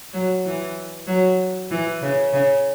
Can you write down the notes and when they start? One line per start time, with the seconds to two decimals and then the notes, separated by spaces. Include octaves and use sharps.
0.13 F#3
0.45 E3
1.07 F#3
1.71 E3
2.02 C#3
2.33 C#3